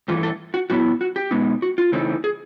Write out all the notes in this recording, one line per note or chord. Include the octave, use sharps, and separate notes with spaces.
G2 E3 A3 F4
A4
F#4
A#2 F#3 B3 E4 F#4
F#4
G4
B2 G#3 B3 D#4
F#4
F4
C#3 E3 A3 C4 D#4
G#4